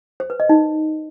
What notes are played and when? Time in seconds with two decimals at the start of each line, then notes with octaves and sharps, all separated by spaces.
0.20 C5
0.30 B4
0.40 D#5
0.49 D#4